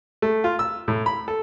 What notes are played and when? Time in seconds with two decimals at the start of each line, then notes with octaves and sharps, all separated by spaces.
0.22 A3
0.44 F4
0.59 E6
0.88 A2
1.06 B5
1.28 A4